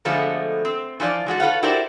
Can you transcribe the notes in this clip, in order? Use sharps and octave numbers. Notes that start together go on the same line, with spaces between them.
B2 D3 F3 G#3 A3 B3
C4
E3 F3 F4 D5
E3 G#3 F#4 A4
F4 A4 B4 C#5 F5 F#5
E4 F#4 G4 A#4 C5 D5